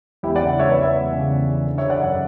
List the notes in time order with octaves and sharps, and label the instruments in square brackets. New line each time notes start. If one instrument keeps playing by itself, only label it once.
[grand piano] E2 E4 G4
D5 F#5
C#3
E2 C#5 E5
B4 D5
E3
C#5 E5
E2
C#3
E2
E3
D3
C#5 E5
D3
D5 F#5
F#2 C#5 E5